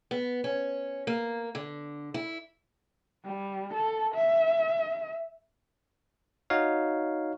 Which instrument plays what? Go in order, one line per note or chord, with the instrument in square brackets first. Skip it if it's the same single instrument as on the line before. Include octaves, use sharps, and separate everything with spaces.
[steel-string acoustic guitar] B3
C#4
A#3
D3
E4
[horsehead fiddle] G3
A4
E5
[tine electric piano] D#4 F#4 C#5 F5